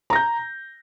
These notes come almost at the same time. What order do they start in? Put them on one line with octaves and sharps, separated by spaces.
A#5 A#6 G6